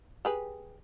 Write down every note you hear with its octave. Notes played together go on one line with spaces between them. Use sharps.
G4 G#4 B4